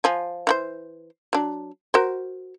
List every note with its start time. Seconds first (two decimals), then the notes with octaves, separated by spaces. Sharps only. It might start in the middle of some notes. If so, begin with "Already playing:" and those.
0.04 F3 G#5
0.47 E3 F#4 C5
1.33 F#3 D4
1.94 F#4 A#4 C5